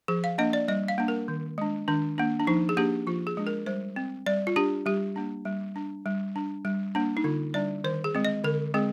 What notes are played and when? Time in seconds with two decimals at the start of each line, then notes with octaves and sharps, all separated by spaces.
0.08 F3 G#4
0.24 F5
0.38 A#3 D4 D#5
0.53 D5
0.68 G3 D#5
0.88 F5
0.98 A#3 D4
1.08 A#4
1.28 D#3
1.58 G#3 D4
1.88 D#3 D4
2.18 A#3 D4
2.40 D4
2.47 F3 D#4
2.69 G#4
2.77 A#3 D4 G4
3.07 F3 F4
3.27 G#4
3.37 G#3 D4
3.47 A#4
3.66 G3 C5
3.96 C4
4.26 G3 D5
4.47 F4
4.56 D4 G4
4.86 G3 G4
5.16 A#3 D4
5.45 G3
5.76 D4
6.06 G3
6.36 D4
6.65 G3
6.95 A#3 D4
7.17 D#4
7.24 D3 F4
7.54 G3 D4 D5
7.84 D#3 C5
8.04 G#4
8.15 G#3 C4
8.25 D#5
8.44 D3 A#4
8.74 G#3 C4 G#4